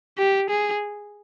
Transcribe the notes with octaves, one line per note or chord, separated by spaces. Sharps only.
G4
G#4